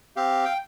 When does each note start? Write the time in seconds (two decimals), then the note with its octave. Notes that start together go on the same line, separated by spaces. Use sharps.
0.16 C4 G4 F5
0.45 G5